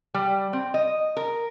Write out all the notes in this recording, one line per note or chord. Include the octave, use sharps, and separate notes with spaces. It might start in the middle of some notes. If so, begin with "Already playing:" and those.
G3
C4
D#5
A#4